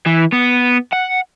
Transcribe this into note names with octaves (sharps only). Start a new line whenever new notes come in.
E3
B3
F#5